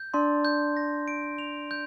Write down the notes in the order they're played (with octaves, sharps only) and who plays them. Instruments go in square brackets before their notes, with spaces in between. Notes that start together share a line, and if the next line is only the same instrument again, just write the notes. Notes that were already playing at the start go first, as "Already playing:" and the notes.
Already playing: [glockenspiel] G6
[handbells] D4 D5 [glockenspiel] C6
[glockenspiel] G6
A#6
D7
F7
G6